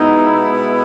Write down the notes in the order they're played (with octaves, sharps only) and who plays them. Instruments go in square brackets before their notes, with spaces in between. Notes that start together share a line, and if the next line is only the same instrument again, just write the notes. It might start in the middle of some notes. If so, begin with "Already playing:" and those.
Already playing: [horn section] B2 G#3 B3 E4 [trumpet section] D#4